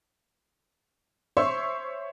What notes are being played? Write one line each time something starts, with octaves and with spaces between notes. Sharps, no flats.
C5 C#5 E5 C6 C#6 E6